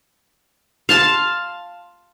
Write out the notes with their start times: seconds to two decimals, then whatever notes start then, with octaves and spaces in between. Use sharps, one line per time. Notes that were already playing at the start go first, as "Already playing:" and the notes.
0.89 F5 A5 C6